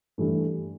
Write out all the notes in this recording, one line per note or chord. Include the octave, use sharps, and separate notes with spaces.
G2 E3 A3